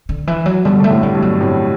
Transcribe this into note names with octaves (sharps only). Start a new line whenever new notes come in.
D3
E3
F#3
B2 D3 G3
D3 A3
A2 C3
G3
G2 B2
F#3
A2 C3